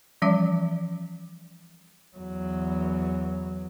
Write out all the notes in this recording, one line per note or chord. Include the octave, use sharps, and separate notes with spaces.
E3 F3 G3 C#4 D5 E5
E2 F#3